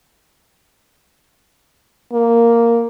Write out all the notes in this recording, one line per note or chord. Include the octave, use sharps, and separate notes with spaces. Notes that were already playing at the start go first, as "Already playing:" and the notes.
A#3